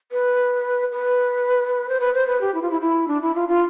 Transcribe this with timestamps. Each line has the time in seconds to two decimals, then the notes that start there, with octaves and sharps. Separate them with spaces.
0.12 B4
0.92 B4
1.89 C5
2.00 B4
2.14 C5
2.27 B4
2.41 G4
2.54 E4
2.62 F4
2.71 E4
2.81 E4
3.08 D4
3.22 E4
3.35 F4
3.49 F4